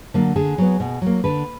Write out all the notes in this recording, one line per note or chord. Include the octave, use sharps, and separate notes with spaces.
D3 F#3 A#3
D3 G#4
F#3 B3
B2
F#3 A#3
D3 B4